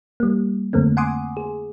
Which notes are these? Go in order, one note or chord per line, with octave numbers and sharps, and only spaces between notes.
G3 A#3
F2 D3 A3 A#3 C4
F#5 G#5 C6 D6 D#6
G#4